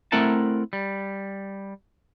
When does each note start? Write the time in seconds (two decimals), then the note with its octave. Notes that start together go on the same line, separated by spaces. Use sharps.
0.12 A3 C4 E4 A#4 F#5 A5
0.73 G3